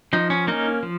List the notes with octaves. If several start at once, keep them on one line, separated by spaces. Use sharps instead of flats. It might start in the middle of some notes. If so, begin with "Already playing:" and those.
F3 D#4
C#4
A#3 C#4 D#4
F3